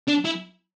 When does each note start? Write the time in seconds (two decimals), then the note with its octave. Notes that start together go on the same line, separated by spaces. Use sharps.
0.08 D4
0.25 E4